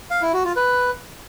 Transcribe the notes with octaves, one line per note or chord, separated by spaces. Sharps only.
F5
E4
F#4
F4
B4